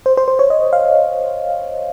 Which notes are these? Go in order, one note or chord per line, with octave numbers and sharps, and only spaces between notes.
C5
C5
C5
C#5
D#5
F5